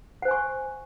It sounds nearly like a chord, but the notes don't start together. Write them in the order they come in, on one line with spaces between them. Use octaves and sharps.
F#5 C5 G#5 C#6